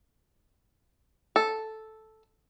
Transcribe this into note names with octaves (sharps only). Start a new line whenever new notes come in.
A4